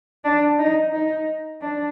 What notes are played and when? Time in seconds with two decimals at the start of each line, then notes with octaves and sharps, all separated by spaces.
0.24 D4
0.59 D#4
0.92 D#4
1.61 D4